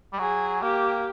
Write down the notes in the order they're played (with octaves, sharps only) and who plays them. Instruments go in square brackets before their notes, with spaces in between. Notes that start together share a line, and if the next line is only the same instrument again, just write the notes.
[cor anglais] G3
[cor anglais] F#3 [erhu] G#4
[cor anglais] A#3 [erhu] G4